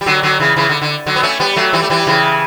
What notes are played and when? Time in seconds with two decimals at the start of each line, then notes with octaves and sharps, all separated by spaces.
0.01 G3
0.06 D3 F#3
0.23 D3 F#3
0.40 C#3 E3
0.56 C#3 E3
0.69 D3
0.81 D3
1.06 D3 F#3
1.16 B3
1.23 A3 C#4
1.40 G3 B3
1.56 F#3 A3
1.73 E3 G3
1.82 A3
1.90 E3 G3
2.07 C#3 E3